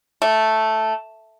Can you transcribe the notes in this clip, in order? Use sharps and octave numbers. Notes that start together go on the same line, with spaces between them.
A3